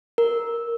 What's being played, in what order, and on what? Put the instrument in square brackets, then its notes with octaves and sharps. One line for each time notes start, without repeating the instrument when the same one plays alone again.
[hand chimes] A#4